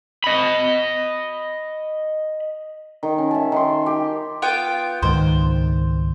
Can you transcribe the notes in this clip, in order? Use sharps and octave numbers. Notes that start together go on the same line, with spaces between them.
D#5 B5
D#3
C#4
E5 A5
D#3 C6
G4
B3 F4 G5
C#2 G#2 D#3 C5